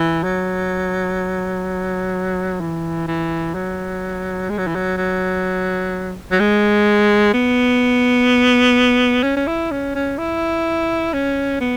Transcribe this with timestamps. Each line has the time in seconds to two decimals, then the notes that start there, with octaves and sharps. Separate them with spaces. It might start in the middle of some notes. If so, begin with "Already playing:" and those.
Already playing: E3
0.24 F#3
2.60 E3
3.07 E3
3.54 F#3
4.50 G#3
4.58 F#3
4.67 E3
4.75 F#3
4.97 F#3
6.32 F#3
6.40 G#3
7.33 B3
9.23 C#4
9.37 C#4
9.47 E4
9.71 C#4
9.95 C#4
10.18 E4
11.13 C#4
11.60 B3